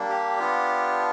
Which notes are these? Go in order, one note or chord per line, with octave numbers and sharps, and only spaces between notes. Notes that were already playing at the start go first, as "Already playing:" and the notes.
Already playing: G3 A#3 D4
G4
B3 D4 F4